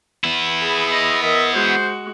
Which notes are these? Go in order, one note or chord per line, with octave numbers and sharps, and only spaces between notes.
B3 E4
G#4 B5
D#5
A#4 D#5 E5
G#3 F#4 C5